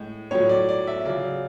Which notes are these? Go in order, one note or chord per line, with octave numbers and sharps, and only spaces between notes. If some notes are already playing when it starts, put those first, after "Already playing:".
Already playing: A2 G#3
A2 F#3 C#5
D5
D5
E5
C#3 F#3 D5